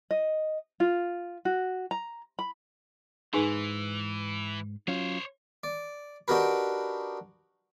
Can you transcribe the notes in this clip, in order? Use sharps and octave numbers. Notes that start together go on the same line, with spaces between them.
D#5
F4
F#4
A#5
B5
G#2 E3 D#4 G#4 B4 G#5 C6
F#3 C#4 F4 C5 C#5
D5
D4 D#4 F#4 G4 A#4 B4